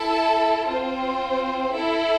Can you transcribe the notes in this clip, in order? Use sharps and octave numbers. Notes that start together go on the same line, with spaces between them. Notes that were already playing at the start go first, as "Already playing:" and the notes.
Already playing: E4 A4 E5 A5
C4 F4 C5
E4 A4 E5